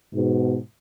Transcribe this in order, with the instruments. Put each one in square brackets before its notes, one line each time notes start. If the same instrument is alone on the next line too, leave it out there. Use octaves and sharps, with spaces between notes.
[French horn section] G#2 B2